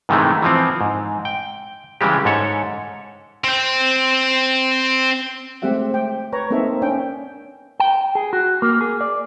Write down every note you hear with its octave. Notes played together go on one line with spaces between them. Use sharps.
G#2 C3 D#3 E3 G#3 A3
E3 F3 C4
G#2
G5
C#3 E3 G3 G#3 G4
G#2 A4 C#5
C4 G5
G#3 A3 C4 G4 E5 F#5
G5
B4 C#5 A#5
A#3 C4 D#4 A4 A#4 E5
C#4 D4 G5
G5
G#4
F#4
A#3
G#4
D5